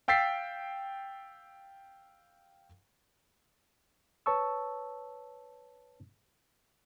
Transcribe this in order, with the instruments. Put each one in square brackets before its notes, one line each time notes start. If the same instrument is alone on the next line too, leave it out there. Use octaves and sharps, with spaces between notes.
[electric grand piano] F5 G5 E6 A6 B6 C7
[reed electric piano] B4 C#5 A5 C#6 E6